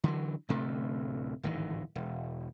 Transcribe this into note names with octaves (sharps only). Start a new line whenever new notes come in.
D3 E3 F#3
D1 D2 C3 A3
D1 G#1 D#3 E3
E1